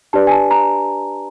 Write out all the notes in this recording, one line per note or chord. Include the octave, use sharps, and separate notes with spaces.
D4 G4 B4 D5 A5
G#5
A5
A#5